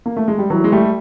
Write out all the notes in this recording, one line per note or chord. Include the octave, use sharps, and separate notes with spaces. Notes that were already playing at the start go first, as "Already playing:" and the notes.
A#3
A3
G#3
G3
E3 F#3
G#3
G3 A3